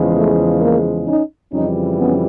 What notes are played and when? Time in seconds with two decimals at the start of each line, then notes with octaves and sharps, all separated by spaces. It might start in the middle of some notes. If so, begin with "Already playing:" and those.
Already playing: E2 C#3 F3 G#3
0.15 A3
0.60 A#3
1.07 C#4 D#4
1.52 F2 C#3 E3 G3 C#4 D#4
1.98 B3 C#4